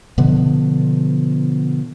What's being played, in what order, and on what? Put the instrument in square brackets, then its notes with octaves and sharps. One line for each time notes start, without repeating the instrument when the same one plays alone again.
[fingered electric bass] B2 D3 F3 B3